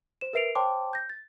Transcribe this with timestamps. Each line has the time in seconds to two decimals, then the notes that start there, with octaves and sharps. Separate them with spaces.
0.21 C5 E7
0.33 A#4 B4 E5 C7 D7 F7
0.55 C5 C#5 G5 A5 C6 D6
0.93 G6 A#6
1.09 A6